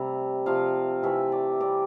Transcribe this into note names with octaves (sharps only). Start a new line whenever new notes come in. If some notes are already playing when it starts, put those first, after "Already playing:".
Already playing: C3 G3 A3 E5
C3 F3 A3 F5
C3 E3 A3 E5
D5
C3 G3 D5